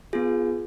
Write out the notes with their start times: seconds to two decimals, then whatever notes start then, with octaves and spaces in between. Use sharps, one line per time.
0.13 B3 F4 G#4